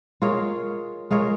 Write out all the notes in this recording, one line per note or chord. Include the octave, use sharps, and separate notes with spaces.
G#3 F4 A#4 C#5
G#3 F4 A#4 C#5